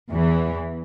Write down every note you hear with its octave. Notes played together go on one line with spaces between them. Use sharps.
E2 E3